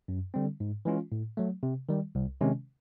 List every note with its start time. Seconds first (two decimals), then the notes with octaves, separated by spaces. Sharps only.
0.08 F#2
0.34 D3 G3 C4
0.60 G#2
0.85 E3 G#3 C#4 F4
1.12 A2
1.37 F#3 A3
1.63 C3
1.89 D#3 G3
2.15 C2
2.40 C3 D#3 G#3 C#4